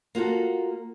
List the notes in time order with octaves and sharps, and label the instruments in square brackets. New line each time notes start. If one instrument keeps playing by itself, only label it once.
[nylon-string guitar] A#3 F4 F#4 A4